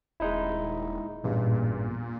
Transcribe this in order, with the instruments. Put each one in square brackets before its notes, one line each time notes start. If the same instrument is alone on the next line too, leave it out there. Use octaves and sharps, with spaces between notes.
[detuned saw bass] D#1 [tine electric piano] G#3 D#4 E4
[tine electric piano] A1 E2 G2 [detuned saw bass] A#2